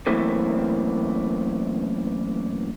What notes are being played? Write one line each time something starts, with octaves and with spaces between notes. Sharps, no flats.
F#2 E3 A3 A#3 C4